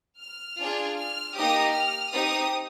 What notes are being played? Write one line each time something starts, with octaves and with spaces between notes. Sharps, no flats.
F6
D4 F4 G#4
F6
A#3 D#4 G4 D#6
F6
C4 D#4 G4 D#6